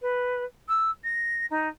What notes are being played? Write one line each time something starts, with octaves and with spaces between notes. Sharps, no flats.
B4
E6
A#6
D#4